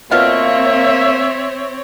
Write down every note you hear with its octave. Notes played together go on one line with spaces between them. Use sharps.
B2 A#3 C4 F4 C#5 E5 F5